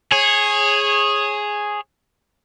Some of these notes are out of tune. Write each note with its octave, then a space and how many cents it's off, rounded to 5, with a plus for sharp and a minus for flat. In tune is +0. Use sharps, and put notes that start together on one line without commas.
G#4 +0 C#5 -20